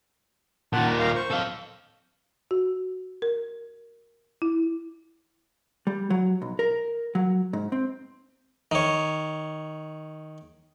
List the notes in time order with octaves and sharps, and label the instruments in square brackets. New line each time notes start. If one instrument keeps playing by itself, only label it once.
[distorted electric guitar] A#2 D#3 [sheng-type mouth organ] F#5 A5
[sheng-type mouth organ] A#5
A#4 F5 A#5
C5 C#6
[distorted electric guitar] A4 F5
[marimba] F#4
A#4
E4
[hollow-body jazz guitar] G3
F#3
B1
A#4
F#3
G#2
C4
[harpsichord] D#3 C#5